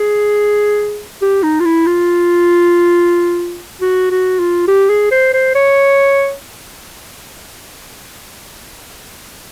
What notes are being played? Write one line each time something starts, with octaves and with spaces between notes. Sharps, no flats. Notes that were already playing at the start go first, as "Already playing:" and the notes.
Already playing: G#4
G4
D#4
F4
E4
F4
F#4
F#4
F4
G4
G#4
C5
C5
C#5